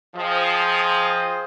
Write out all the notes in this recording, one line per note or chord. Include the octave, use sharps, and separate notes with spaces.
F3 F4 G#4 C5 D#5 G5